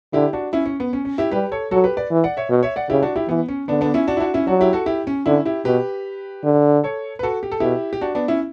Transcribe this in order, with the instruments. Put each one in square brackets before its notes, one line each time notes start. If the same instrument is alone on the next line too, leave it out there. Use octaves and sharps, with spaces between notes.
[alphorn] D3 [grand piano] E4 G4
[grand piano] D4 F#4
C#4 E4
C#4
B3
C#4
C#4
E4 G4
[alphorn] G3 [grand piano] G4 B4
[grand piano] A4 C#5
[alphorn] F#3 [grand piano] F#4 A4
[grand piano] G4 B4
B4 D5
[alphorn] E3
[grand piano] D5 F#5
C#5 E5
[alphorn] B2
[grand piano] C#5 E5
D5 F#5
[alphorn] C#3 [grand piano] E4 G4
[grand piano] D4 F#4
E4 G4
[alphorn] E3 [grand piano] B3
[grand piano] C#4
[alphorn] D3 [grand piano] B3 D4
[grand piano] B3 D4
C#4 E4
D4 F#4
E4
D4 F#4
C#4 E4
[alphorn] F#3 [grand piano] D4 F#4
[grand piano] E4 G4
F#4 A4
E4 G4
C#4
[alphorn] D3 [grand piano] C#4 E4
[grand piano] E4 G4
[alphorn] B2 [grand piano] G4 B4
[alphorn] D3
[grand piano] A4 C#5
B4
F#4 A4
G4
A4
[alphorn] B2 [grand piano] E4 G4
[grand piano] G4
D4 F#4
B3 D4
C#4 E4